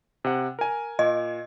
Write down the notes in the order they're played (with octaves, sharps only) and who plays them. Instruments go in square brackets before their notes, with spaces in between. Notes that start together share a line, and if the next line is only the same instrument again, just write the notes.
[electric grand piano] C3 F#5
A#4 G#5
[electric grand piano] A#2 [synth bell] D#5